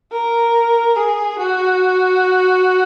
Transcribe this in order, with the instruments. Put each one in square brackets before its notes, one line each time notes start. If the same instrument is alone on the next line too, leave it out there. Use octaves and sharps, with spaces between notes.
[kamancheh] A#4
G#4
F#4